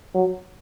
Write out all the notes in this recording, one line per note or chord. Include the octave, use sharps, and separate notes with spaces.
F#3